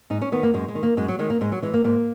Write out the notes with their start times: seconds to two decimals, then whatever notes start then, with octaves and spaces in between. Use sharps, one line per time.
0.10 G#2 D#4
0.21 C#4
0.32 D#3 B3
0.43 A#3
0.54 F#2 G#3
0.68 G#3
0.75 D#3
0.83 A#3
0.97 F#2 G#3
1.08 F#3
1.19 D#3 G#3
1.30 A#3
1.41 G#2 G#3
1.52 F#3
1.62 E3 G#3
1.74 A#3
1.84 G#2 A#3